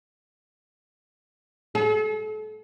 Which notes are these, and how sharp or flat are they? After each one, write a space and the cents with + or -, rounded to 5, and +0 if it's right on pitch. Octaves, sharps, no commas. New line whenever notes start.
A4 -40